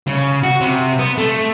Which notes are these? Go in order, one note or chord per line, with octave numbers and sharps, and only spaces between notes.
C#3
F#4
C3
B3
A3